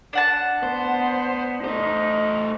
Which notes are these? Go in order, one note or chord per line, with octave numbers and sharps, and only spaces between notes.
D4 F#5 A5
B3 C5
A3 D#4 C5